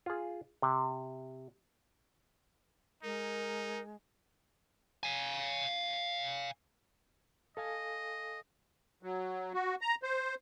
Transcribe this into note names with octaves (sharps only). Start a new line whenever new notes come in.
F4 G#4
C3
G#3 D#4 A#4
F5 G#5
A4 D#5 F5 G#5
F#3
F#4
A#5
C5